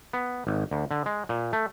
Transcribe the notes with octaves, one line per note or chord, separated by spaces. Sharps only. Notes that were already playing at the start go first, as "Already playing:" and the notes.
B3
G#1
D2
D3
G#3
A#2
A3